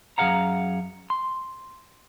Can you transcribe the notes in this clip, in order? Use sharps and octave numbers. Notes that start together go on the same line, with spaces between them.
F#2 F#3 G#4 F5 F#5 A#5
C6